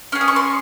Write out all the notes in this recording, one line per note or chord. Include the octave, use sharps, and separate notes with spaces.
C#4 G#4 F6
D#6
C#6
C6